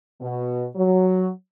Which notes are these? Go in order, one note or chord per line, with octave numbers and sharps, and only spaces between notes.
B2
F#3